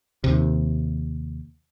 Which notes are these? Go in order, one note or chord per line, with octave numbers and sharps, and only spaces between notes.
D#2 C3